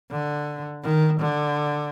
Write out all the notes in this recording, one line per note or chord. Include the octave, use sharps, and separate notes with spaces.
D3
D#3
D3